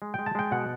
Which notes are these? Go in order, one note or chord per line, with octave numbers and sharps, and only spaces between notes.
G#3
G#3 G5
A5
G#3 G5
B2 F#5